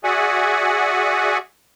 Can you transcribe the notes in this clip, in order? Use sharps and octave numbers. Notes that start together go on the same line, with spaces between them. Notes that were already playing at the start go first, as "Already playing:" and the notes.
F#4 G#4 D5 E5 F#5 G#5